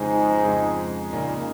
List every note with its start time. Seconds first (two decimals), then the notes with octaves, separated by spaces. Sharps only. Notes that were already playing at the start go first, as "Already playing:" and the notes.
Already playing: F2 G#2 C#3 G#3 D#4
0.45 F2 C#3 G#3 D#4
1.11 A#2 C#3 A#3 D#4